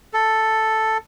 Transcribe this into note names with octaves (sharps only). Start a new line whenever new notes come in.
A4